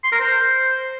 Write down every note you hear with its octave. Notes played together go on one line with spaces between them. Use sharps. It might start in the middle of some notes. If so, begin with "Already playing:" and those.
C6
A#4
C5